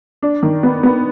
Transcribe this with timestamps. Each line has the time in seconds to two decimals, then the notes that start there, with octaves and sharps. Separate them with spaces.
0.23 D4
0.43 D#3
0.63 B3
0.83 B3